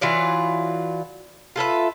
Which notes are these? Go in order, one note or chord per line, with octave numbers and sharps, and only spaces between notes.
E3 F#3 F4 D5
F4 A4 B4 E5